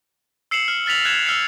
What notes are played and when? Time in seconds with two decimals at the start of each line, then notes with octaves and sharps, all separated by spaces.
0.51 E6 C7 C#7 E7 F#7
0.68 F6
0.86 F6 A6 B6 F7 F#7
1.05 F6 F#6 G#6 E7 F7
1.26 E6 F6 C7 C#7